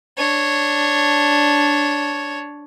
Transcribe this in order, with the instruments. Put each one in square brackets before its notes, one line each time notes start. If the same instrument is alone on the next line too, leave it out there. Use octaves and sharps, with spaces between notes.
[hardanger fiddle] D4 C#5